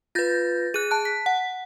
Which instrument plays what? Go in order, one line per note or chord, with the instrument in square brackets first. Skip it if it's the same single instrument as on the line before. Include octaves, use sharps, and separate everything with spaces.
[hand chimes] F4 B4 [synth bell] G6 A6 A#6
[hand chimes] G#4 [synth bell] F#6 D#7
[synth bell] A5 F#6
[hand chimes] B6
[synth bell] F#5